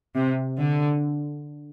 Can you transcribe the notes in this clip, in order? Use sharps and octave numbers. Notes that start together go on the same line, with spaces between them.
C3
D3